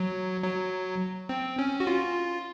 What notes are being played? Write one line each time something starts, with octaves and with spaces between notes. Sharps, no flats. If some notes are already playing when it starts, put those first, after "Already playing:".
Already playing: F#3
F#3
C4
C#4
F#4
F4